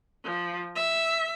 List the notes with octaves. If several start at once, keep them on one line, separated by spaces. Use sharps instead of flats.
F3
E5